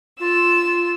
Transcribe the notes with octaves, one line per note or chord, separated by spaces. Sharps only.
F4 E6